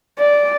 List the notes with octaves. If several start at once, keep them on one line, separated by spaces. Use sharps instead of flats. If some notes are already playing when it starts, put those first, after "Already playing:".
D5